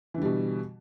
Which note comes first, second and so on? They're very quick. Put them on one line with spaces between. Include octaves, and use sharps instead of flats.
E3 D3 G3 B2